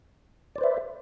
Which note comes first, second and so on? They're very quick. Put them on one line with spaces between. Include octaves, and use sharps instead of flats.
D5 C5 B4 E5